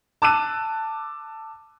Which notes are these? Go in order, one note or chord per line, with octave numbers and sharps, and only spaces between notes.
A5 D6 E6 F#6 D#7